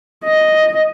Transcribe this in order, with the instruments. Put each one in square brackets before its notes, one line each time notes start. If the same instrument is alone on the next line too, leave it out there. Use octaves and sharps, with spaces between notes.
[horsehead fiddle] D#5